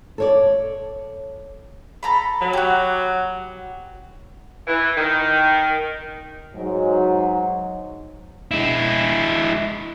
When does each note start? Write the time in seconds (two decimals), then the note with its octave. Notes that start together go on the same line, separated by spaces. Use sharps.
0.18 A4 C#5 D5
2.03 A4 A#5 B5
2.41 F#3
2.53 F#4 G4
4.67 E3
4.97 D#3
6.55 G#2 F#3
8.51 G#3 E4